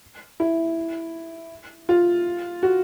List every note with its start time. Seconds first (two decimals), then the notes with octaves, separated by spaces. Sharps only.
0.40 E4
1.89 F4
2.63 F#4